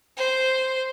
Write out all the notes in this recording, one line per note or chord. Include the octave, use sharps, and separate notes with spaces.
C5